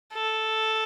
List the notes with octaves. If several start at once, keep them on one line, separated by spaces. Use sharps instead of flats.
A4